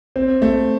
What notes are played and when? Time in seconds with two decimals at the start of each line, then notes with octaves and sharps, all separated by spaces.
0.16 C4
0.42 A3